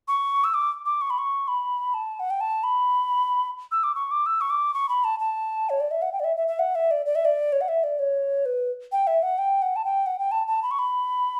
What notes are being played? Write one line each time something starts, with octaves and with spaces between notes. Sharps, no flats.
C#6
E6
D6
D6
C#6
B5
C#6
B5
A5
F#5
G5
A5
B5
E6
D6
C#6
D6
E6
C#6
D6
C#6
B5
A5
A5
C#5
D5
E5
F#5
G5
D5
E5
E5
E5
F#5
E5
D5
D5
E5
D5
C#5
F#5
E5
D5
C#5
B4
G5
E5
F#5
G5
F#5
A5
G5
F#5
G5
A5
A5
B5
C#6
B5